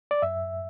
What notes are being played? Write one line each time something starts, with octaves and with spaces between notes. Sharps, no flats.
D5
F#2 E5